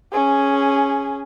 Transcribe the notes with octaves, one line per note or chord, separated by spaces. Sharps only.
C#4 G#4